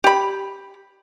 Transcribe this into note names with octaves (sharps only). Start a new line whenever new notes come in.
G4 B5